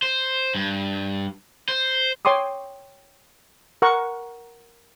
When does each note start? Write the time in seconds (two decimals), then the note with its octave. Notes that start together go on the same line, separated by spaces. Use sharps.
0.02 C5
0.55 G2
1.68 C5
2.25 C#5 G5 C6 D6 D#6
3.82 A#4 F#5 C#6